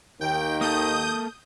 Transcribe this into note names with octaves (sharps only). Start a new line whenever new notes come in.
D#2 D#3 G5
A#3 A4 D#6 G6